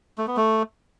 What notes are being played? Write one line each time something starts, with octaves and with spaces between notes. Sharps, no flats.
A3
B3
A3